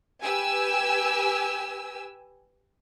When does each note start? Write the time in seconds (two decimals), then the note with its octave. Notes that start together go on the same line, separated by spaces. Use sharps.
0.24 G4 B4 G#5 E6